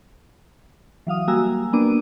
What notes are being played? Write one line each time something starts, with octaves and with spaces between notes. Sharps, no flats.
E3 F#3 F5 D#6
G3 A#3 F#4 G#5 A#5 E6
A#3 B3 D4 D6 D#7